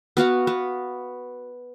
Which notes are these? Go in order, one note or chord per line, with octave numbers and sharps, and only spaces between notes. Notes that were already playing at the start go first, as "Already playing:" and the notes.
B3 F#4 F5 F#5
B3